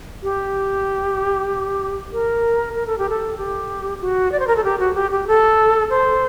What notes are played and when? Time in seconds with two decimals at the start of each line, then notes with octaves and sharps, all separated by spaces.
0.23 G4
2.12 A#4
2.75 A#4
2.87 A4
2.98 G4
3.09 A4
3.38 G4
4.01 F#4
4.32 D5
4.39 C5
4.47 A#4
4.56 A4
4.64 G4
4.79 F#4
4.95 G4
5.11 G4
5.27 A4
5.90 C5